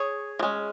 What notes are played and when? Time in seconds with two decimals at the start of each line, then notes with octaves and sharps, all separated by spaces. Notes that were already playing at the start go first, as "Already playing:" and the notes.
Already playing: G#4 C#5
0.39 F3
0.43 G#3 C#4